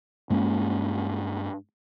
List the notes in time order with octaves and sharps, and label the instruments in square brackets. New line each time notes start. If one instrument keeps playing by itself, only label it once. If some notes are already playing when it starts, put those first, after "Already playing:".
[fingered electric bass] G2 G#3 A#3 C#4